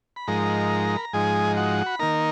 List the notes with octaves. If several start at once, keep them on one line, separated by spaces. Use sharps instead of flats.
B5
G#2 F3 G#3 D#4 A#4 A#5
B5
A#5
G#2 F3 G#3 D#4 G#4 G#5
F#4 F#5
B5
D#3 A#3 D#4 A#4 A#5